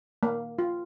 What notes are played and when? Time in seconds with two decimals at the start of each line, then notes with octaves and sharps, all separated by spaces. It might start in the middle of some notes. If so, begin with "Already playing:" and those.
0.23 A#3
0.59 F4